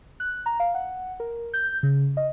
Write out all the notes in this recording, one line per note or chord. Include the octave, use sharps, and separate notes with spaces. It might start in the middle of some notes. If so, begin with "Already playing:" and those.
F#6
A#5
F5
F#5
A#4
G6
C#3
D#5